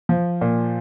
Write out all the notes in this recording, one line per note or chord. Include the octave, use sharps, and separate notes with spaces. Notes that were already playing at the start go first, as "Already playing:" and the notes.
F3
A#2